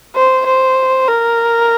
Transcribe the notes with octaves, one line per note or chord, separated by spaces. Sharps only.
C5
C5
A#4